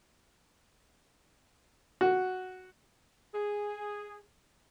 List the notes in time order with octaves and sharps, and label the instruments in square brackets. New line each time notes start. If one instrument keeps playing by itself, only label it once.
[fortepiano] F#4
[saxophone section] G#4